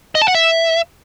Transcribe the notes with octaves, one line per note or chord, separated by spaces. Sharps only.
D#5
A5
F#5
E5